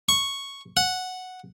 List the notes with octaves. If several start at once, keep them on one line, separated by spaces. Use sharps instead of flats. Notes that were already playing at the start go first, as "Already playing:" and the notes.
C#6
F#5